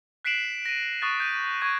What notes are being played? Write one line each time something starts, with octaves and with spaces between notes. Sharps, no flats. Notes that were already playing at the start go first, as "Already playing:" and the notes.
F#6 B6 C7 D7 E7 F#7
A#6 D#7
C#6 D#6 F#6 A6
G6 D#7
C#6 G#6 D#7